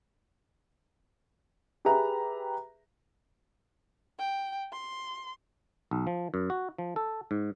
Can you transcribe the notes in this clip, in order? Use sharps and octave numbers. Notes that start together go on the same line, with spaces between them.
G4 G#4 B4 E5 A#5
G5
C6
B1
F3
F#2
F#4
F3
A4
G#2